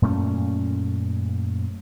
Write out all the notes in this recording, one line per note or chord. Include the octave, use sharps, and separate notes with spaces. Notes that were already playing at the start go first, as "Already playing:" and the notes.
F#2 A#2 A3 C#4